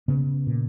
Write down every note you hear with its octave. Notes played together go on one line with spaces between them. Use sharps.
C#3 B3
A#2